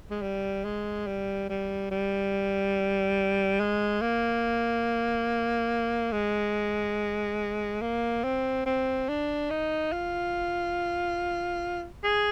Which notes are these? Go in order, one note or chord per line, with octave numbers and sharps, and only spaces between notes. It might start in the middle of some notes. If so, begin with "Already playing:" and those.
G#3
G3
G#3
G3
G3
G3
G#3
A#3
G#3
A#3
C4
C4
D4
D#4
F4
G#4